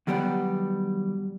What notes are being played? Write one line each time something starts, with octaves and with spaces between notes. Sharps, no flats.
D#2 F#3 G3 B3 D5 F#5